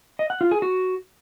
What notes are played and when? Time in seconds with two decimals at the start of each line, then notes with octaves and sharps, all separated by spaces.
0.19 D#5
0.30 F#5
0.41 F4
0.51 G#4
0.62 F#4